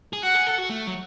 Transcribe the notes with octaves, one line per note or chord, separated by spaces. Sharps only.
G#4
F#4 F#5
G#4
A4
F#4
A3
F#3